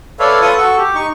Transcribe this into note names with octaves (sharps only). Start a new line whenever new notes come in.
A4 B4 C#5 D5 E5 F5
F4 A4 B4 C#6 D#6
F#4 A4 C#6
G4
D#4 C#6